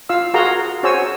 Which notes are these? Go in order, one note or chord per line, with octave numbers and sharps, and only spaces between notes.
F4 F5 E6
F#4 G#4 A#4 F5 A#5 C6
F#4 G#4 C5 C#5 G#5 E6